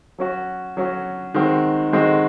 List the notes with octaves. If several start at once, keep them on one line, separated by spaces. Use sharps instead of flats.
F#3 C#4 F#4
F#3 C#4 F#4
D#3 G#3 C4 F#4
D#3 G#3 C4 F#4